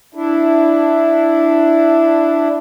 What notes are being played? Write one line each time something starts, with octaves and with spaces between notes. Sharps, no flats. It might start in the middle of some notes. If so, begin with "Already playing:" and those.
D4 E4